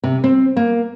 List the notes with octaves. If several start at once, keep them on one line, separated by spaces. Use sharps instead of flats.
C3
C4
A#3